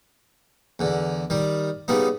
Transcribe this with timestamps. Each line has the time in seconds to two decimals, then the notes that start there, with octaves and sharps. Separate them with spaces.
0.79 E2 D3
1.30 D#3 G3
1.88 C#3 G3 B3 D#4